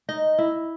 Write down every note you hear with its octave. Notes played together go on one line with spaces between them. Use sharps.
D#4 D#5
E4